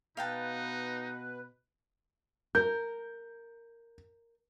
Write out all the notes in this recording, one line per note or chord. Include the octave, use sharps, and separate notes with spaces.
B2 D#4 B4 F5 G5 A5
A#4 G6